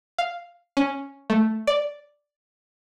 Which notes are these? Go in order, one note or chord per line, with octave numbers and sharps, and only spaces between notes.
F5
C#4
A3
D5